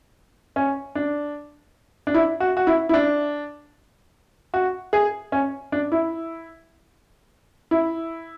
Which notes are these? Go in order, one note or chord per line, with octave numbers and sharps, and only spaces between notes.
C#4
D4
D4
E4
F#4
F#4
E4
E4
D4
F#4
G#4
C#4
D4
E4
E4